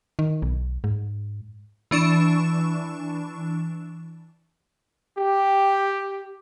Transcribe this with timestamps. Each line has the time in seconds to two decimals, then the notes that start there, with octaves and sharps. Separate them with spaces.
0.19 D#3
0.42 B1
0.84 G#2
1.91 E3 D4 C#6 E7
5.19 G4